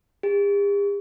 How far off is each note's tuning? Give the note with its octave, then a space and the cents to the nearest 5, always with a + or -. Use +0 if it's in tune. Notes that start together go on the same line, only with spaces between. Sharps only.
G4 +45